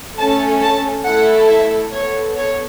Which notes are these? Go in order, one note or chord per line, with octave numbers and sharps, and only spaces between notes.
A3 C#4 A4 A5
A5
A3 E4 A4 F#5
E5
B3 A4 C#5
C#5